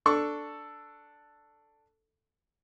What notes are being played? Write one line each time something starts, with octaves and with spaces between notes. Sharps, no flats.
D4 A4 C#6